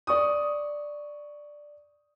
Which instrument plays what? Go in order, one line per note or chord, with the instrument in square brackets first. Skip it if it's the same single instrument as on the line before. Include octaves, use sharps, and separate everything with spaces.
[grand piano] D5 C#6 D#6